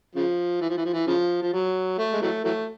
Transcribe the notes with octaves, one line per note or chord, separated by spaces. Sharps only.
C#3 F3
E3
F3
E3
F3
E3
C#3 F3
F3
F#3
A3
G#3
E3 F#3 A3
E3 F#3 A3